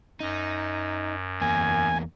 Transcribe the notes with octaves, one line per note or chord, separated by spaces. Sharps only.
F#2 D#4
E2 A#3 G#5